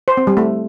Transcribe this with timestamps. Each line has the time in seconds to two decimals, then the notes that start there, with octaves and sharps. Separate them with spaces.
0.08 C5
0.17 C4
0.27 G3
0.37 A3